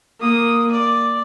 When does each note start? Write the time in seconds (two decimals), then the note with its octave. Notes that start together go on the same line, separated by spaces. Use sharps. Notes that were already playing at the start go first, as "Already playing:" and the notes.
0.20 A#3 D#6
0.71 D5